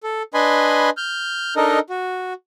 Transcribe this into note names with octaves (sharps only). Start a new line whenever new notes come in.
A4
D4 B4 D#5 G#5 B5 C6
F6 G6
D4 D#4 A4 A#4 D#5
F#4